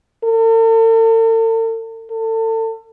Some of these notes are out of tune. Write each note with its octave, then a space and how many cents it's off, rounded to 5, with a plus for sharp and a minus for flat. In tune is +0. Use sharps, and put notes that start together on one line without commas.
A4 +45
A4 +30